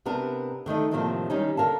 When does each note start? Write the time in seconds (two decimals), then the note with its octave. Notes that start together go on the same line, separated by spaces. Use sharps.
0.06 C3 B3 D4 A#4
0.66 D3 D#3 A3 D#5
0.91 A2 C3 D#3 F3 A#3 D4
1.30 D#3 G3 C#4 D#4
1.57 D3 A#4 F5 A5